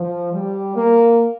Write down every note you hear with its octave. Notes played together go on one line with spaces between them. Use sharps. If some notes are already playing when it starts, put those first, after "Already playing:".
Already playing: F3
G3
A#3